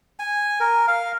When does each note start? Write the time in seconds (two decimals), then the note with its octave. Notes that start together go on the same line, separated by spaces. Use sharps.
0.19 G#5
0.60 A#4
0.88 F5